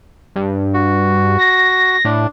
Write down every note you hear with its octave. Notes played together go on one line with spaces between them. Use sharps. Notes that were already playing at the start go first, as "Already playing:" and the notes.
G2
F#4
A#6
A2 D4